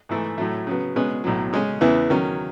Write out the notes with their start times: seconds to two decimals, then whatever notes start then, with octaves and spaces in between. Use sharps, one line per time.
0.09 G#2 E3 A3 E4
0.38 A2 F#3 A3
0.67 C#3 F#3 B3
0.96 B2 G#3 C#4 G#4 B4
1.24 B1 A2 F#3
1.53 C#3 G#3 C#4
1.81 E2 C#3 E3 B3 E4
2.10 D#3 F#3 C#4